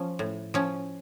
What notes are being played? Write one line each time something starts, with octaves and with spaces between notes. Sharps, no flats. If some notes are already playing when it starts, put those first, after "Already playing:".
Already playing: F3 C#4
A2
F3 C#4